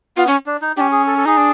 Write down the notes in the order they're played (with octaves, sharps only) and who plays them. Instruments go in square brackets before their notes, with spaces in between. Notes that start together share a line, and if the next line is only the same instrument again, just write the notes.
[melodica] B3 [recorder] F4
[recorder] C#4
[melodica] D4
D#4
[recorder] C#4 D4 [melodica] G4
[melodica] G#4
A4
A4
[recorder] D#4 [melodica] G#4
[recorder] D4